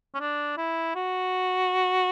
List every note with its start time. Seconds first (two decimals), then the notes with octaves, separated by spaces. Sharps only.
0.14 C#4
0.20 D4
0.57 E4
0.95 F#4